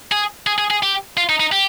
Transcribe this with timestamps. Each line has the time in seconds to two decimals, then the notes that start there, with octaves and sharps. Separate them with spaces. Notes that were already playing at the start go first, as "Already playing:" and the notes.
0.12 G#4
0.47 G#4
0.58 G#4
0.71 G#4
0.83 G4
1.17 F4
1.29 D#4
1.40 D#4
1.52 G4